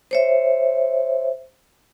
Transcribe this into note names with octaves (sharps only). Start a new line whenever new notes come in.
C5 C#5 E5